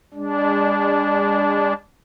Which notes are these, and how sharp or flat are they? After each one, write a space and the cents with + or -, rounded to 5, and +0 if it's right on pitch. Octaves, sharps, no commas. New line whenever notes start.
G#3 -45 D4 -20